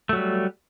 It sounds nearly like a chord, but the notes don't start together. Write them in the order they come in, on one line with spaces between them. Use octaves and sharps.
A3 F#3 G3